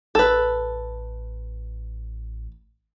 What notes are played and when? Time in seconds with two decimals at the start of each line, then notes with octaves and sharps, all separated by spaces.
0.15 A1 A4 B4